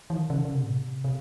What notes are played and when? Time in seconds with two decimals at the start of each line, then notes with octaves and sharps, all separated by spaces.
0.10 E3
0.15 D#3
0.30 C#3
0.45 C#3
0.54 C3
0.63 A2
0.73 C3
1.04 C3